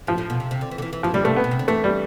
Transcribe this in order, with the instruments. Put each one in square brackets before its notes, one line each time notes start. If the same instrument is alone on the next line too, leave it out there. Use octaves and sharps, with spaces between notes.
[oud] A2 [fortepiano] F3
[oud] A2
B2
C3
C3
D3
E3
D3
E3
E3
[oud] E3 [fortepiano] F3
[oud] D3 [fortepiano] G3
[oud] C3 [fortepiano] A3
[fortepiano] B3
[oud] B2
C3
D3
[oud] E3 [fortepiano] A3
[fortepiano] G3